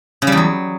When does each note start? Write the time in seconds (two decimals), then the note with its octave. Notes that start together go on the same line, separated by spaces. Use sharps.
0.22 C#3
0.27 G3
0.32 E2
0.37 F#3